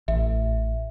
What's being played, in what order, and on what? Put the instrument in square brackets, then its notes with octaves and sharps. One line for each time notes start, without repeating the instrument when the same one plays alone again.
[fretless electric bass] A1 [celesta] E5